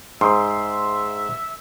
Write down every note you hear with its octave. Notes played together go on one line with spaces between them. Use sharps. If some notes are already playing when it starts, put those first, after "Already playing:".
G#2 E5 C6